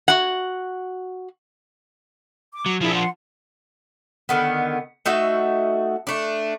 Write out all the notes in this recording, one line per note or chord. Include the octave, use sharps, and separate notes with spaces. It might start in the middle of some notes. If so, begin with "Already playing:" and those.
F#4 F#5
D6
F#3
F3 D4 E4 G#4
F#5 C6
D3 D#3 B3
A3 D#4 F#4 E5
A3 D4